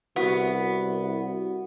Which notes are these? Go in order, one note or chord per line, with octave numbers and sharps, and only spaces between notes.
C2 B3 E4 F#4